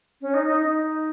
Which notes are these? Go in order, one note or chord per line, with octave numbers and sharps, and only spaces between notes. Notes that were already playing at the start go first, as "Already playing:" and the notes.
C#4
D#4
D#4
D#4